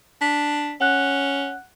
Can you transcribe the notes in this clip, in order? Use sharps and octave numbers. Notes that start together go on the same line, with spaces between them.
D4 B6
C#4 F#5 F#6